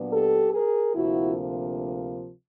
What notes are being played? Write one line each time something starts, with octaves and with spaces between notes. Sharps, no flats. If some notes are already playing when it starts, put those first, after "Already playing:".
Already playing: A#2 F#3 B3 D4
G4 A4
G#4 A#4
D2 C3 F3 A#3 E4 F#4